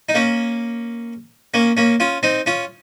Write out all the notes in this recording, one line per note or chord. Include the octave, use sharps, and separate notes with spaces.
D#4
A#3 C#4
A#3 C#4
A#3 C#4
C#4 F4
C4 D#4
C#4 F4